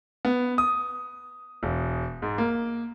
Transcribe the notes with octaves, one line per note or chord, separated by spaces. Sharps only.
B3
D#6
E1
G#2
A#3